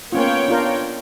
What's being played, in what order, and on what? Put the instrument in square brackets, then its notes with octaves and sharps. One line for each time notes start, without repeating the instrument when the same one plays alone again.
[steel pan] A#3 C#4 F4 [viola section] B3 C#5 G5
[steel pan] D4 F4 A#4